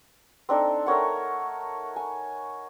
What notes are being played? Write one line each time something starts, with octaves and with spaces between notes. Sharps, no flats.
C4 D4 D#4 A4
A3 A#4 C#5 F#5
G#5